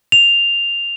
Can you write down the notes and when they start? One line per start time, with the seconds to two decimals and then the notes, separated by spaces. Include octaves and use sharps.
0.12 F7